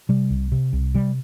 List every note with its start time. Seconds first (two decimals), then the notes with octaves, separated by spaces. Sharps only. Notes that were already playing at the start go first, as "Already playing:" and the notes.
0.09 C3 G3
0.30 C2
0.52 C3
0.73 C2
0.94 C3 G3